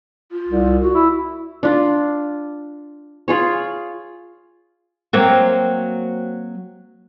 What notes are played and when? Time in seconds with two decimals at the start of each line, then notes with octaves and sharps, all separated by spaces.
0.32 F4
0.48 C2
0.81 F#4
0.94 E4
1.63 D4 F4
3.28 F4 G#4 C#5
5.13 F#3 A#3 C4